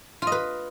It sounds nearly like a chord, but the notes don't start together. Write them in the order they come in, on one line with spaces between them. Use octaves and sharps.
F4 D#5 B4